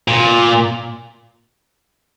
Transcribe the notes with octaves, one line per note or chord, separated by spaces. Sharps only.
A#2